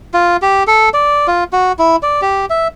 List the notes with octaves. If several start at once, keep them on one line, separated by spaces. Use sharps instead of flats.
F4
G4
A4
D5
F4
F#4
E4
D5
G4
E5